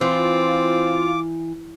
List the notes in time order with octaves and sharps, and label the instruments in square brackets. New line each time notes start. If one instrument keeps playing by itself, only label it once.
[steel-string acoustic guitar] E3 [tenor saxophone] C4 [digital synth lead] F4 [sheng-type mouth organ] D6